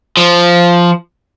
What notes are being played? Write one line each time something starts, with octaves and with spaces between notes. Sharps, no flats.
F3